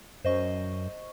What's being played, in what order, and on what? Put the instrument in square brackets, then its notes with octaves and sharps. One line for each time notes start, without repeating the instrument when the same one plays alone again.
[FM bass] F#2 [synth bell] C5 D#5 C#6